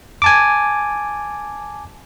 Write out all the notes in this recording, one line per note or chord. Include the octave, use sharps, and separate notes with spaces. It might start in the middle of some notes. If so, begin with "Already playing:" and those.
G#5 A5 D6